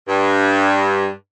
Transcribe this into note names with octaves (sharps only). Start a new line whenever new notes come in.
G2